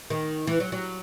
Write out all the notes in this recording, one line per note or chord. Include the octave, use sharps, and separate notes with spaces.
D#3
E3
F#3
F#3